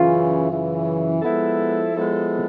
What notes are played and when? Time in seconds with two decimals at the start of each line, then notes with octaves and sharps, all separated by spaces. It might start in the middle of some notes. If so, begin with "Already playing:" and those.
Already playing: F#2 C#3 E3 F4
0.48 F#2 C#3 E3
1.22 F3 G#3 B3 E4 A4
1.95 F3 G#3 B3 E4 A4